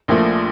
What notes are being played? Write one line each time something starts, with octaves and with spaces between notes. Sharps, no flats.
A#1 A#2 F3 A3